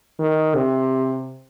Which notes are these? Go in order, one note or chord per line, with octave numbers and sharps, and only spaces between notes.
D#3
C3